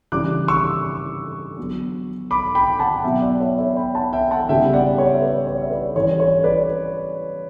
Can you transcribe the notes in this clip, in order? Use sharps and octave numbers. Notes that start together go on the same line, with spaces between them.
C#3 E3 G3 D4 D6 F#6
C#6 E6
D3 F#3 B3 D4
B5 D6
G5 B5
F#5 A5
B2 F#3 B3 E5 G5
D5 F#5
C#5 E5
C#5 E5
G5 B5
F#5 A5
E5 G5
F#5 A5
C#3 G3 B3 E5 G5
D5 F#5
C#5
E5
B4 D5
C#5
E5
B4 D5
E3 G3 C#4 C#5
C#5
B4 D5